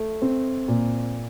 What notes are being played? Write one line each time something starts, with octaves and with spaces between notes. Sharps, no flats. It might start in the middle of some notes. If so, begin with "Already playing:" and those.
Already playing: A3
C4
A#2